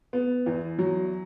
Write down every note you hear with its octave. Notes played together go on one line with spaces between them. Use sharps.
B3
E2
F#3